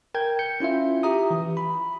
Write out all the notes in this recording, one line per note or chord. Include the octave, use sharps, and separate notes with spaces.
A#4 G5 G6 G#6
G6 C#7
C#4 E4 F4 E5
G4 E5 A#5 D#6
E3
B5